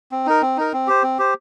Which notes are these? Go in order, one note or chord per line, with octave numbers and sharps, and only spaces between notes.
C4
D#4 A#4
C4
D#4 A#4
C4
G4 C5
C4
G4 C5